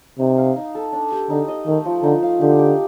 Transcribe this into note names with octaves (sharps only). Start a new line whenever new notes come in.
C3 D#4
F5
D#4
A4
D4
G4
D3 D#4
D#5
D#3 A3
F3
D3 D#4
F5
D3 G4
G4